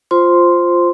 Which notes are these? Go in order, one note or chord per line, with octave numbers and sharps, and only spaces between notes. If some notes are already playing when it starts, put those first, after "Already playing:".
F4 C5 C6